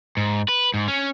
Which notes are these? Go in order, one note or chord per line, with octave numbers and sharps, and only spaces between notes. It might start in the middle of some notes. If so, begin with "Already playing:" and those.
G#2
B4
G#2
C#4